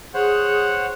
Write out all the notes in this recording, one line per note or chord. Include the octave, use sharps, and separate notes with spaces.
G#4 C5 C#5 F#5